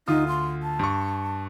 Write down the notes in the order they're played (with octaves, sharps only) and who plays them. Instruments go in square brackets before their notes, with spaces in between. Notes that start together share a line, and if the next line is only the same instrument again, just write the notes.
[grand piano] D2 F4 D#6 [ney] D#4
[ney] C6
A5
[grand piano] G2 C#6